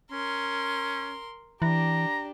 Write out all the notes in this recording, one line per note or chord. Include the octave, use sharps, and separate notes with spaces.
C#4 A#4 C6
E3 D4 G4 A#5